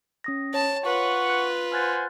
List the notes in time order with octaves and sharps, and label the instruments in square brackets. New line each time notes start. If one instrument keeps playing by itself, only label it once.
[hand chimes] C#4 D#6 A#6
[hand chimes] C#5 [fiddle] A5
[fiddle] F4 B4 [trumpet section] F#5 C#6
[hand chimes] F#6
[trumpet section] C5 F#5 G#5 [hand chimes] F6 F#6 A6